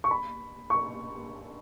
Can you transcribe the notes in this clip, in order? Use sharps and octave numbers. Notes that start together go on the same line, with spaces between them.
C#6
B5
C#6